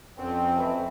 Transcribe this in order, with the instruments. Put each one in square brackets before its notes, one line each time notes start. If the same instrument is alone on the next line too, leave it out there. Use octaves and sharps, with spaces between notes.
[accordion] F2 C4 [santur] C#4 F#5 G5
[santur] A3 B4 E5